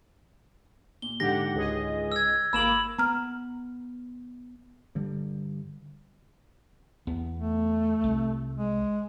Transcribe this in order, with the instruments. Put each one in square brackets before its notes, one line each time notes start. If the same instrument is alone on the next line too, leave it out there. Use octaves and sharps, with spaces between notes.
[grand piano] A#2 [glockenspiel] G7
[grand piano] G#2 D3 [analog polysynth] G4 F#5 [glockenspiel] A#6
[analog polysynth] C#2 G#4 D#5
[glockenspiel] E6 G#6
[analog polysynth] G#1 A#3 D6 [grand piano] B5 [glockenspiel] E6 E7 F#7
[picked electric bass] B3 [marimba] A#5 F6
[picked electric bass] G2 D3 G3
[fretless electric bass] E2 B3
[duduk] A3
[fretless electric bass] C2
[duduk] G#3